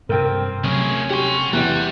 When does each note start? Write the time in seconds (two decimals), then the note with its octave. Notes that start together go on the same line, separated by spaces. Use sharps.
0.09 G2 C3 C4 A#4 G5
0.64 C3 F#3 A3 C#4 G#4
1.10 G4 F#5 C6
1.53 E2 C3 G3 F#5